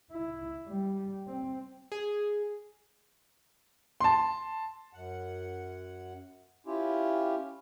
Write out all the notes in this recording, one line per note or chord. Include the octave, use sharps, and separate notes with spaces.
E4
G3
C4
G#4
A5 C6
F#2 F#5
C#4 E4 F4 G4